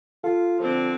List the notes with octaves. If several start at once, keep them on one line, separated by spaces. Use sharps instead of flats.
F4 A4 F5
D3 F3 C4